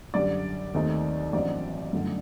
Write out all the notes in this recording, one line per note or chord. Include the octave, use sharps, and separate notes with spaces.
F#2 D3 G3 D5
D#2 D#3 A3 C4 D#4
A1 G2 F#3 C4 D#4 D5
G1 F#2 D3 A3